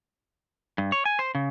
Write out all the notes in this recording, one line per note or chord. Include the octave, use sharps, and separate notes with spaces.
G2
C#5
G#5
C5
C#3